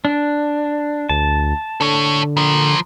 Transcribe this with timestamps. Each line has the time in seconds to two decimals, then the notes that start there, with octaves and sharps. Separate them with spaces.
0.05 D4
1.09 D2 A5
1.81 D3 A4 C#5
2.37 F3 A#4